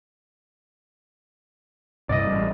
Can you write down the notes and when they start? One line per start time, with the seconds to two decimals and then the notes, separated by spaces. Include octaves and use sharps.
2.09 G2 C3 D5 D#5
2.27 A1 G3